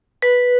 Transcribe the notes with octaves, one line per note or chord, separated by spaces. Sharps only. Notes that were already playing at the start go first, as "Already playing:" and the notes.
B4